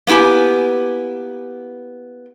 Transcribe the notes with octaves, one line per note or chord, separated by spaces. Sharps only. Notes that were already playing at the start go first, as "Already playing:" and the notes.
A#3 B3 E4 G4 G#5